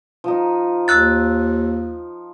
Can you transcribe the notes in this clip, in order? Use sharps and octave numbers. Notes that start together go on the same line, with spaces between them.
F3 D#4
D#2 E6 F#6 A6